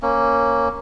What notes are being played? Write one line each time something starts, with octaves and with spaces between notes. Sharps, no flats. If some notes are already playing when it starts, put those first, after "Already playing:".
A#3 C#4